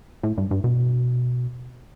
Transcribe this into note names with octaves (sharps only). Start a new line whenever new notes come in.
A2
G2
G2
B2